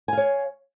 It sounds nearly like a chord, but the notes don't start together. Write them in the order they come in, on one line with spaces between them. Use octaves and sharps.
G#5 F5 C#5